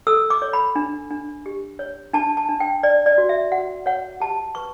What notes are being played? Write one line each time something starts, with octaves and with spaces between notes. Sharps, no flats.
A4 E6
D6
C#5
B5
D4
D4
G4
C#5
D4 A5
A5
D4
G5
C#5 D5
D5
F#4
E5
F#4 F#5
C#5 F#5
G4 A5
B4 C#6